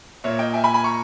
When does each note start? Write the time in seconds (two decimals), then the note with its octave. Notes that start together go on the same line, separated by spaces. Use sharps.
0.24 A#2 A#3 C#5 E5
0.39 D#5 G5
0.54 E5 G#5
0.64 G#5 B5
0.74 G#5 B5
0.84 A#5 C#6